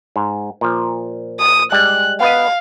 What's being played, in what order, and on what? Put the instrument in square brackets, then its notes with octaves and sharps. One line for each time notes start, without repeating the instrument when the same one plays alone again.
[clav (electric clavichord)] G#2
A#2 F3
[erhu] D#6
[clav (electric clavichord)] G3 G#3 [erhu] F#6
[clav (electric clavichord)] B3 B4 D#5 [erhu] F5